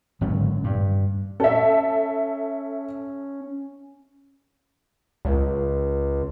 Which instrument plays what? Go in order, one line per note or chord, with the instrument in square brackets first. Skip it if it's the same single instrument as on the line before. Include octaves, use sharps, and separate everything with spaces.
[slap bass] G#1 D3 F#3 C#4
G2
[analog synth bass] C#4 [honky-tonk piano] A4 E5
[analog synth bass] C#2